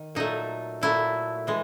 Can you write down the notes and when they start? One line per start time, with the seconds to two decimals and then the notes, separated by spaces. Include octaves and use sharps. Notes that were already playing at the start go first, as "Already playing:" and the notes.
Already playing: D#3
0.15 A#2 F#3 A3 D#4
0.81 A#2 F#3 A3 E4
1.47 A2 E3 G#3